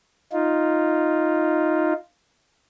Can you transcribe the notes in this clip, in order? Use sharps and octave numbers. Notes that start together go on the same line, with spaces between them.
D#4 F4